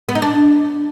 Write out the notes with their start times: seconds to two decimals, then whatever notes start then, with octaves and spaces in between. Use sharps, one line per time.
0.09 B3
0.15 D#4
0.22 D4